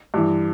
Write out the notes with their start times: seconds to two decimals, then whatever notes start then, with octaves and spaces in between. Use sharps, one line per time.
0.14 G2 E3